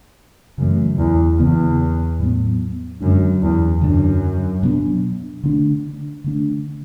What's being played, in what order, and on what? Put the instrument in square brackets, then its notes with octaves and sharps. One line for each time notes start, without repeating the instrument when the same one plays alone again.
[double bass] F#2 [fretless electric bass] C#3 E3 A3
[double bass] E2
[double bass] E2 [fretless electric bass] C#3 E3 B3
[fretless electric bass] A2 F#3 B3
[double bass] F#2 [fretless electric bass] D3 G#3 D4
[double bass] E2
[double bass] F#2 [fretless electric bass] D3 F#3 A3 D4
[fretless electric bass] B2 F#3 B3 D4
D3 A3 D4
D3 A3 D4